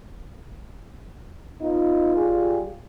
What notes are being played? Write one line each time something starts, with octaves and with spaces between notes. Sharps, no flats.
B3 D#4 F4
G3 G#4